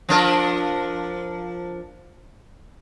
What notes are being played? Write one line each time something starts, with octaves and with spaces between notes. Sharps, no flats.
F3 D4 A#4